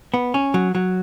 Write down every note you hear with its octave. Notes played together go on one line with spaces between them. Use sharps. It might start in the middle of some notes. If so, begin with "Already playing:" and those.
B3
C#4
F#3
F#3